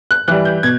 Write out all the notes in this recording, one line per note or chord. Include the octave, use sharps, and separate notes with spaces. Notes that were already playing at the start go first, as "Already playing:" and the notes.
F#6
E3 G3 F#6
G6
B2 G#6